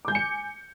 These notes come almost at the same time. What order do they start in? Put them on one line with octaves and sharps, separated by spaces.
D6 G6 G#5 C#7